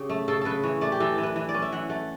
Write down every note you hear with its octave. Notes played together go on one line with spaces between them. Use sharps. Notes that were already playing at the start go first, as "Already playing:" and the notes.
Already playing: C#3 C#4 G4
A3
C#3 A4
C#3 A4 B4
E3 C#5
A3 D5
G4
E3 A4
E3
B4
E3
D5
C#4
E5
E3 F#5
A3